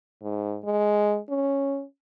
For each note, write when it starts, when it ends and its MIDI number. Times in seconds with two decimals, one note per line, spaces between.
0.22 0.58 44
0.65 1.18 56
1.29 1.84 61